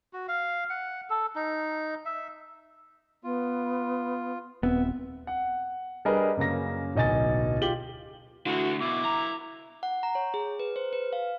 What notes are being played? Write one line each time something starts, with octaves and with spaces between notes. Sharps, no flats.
F#4
F5
F#5
A4
D#4
E5
B3 F4
D#1 B3 C4 E5
F#5
G3 D4 G#4 A#4 B4 D#5
F#2 C#3 A#3 A#6
D1 B1 D#5 G#5 A6
F4 G4 F#7 G7
D3 E3 A3 F#4
B2 E4 D6
A#5
F#5
A#5
C#5
G#4
B4
C5
B4
F5